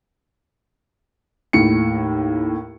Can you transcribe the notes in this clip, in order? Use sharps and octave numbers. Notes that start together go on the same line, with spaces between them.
D#2 A2 C#7